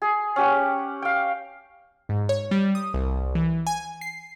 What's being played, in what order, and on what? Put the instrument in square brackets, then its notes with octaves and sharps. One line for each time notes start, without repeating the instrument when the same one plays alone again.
[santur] G#4
C#4 G4 F#5
F5 G5
[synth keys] G#2
C#5
G3
D#6
C2
E3
G#5
C7